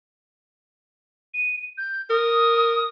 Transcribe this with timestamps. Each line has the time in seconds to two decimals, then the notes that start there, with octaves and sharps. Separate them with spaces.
1.34 D#7
1.77 G6
2.10 A#4 D#6